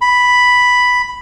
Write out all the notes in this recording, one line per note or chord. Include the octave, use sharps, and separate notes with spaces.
B5